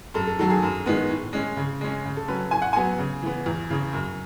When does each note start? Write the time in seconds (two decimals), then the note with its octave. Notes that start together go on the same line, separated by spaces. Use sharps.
0.14 F#2 A4
0.27 A4
0.39 D#3 F#3 A4
0.50 G#4
0.63 F#2
0.86 D#3 G#3 B3
1.10 A2
1.33 G#3 C#4
1.57 C#3
1.81 G#3 C#4
2.05 C#3
2.17 A4
2.28 F#3 C#4 B4
2.51 A2 G#5
2.62 F#5
2.73 F#3 B3 G#5
2.98 C#3
3.23 E3 B3
3.46 E2
3.70 C#3 E3
3.93 F#2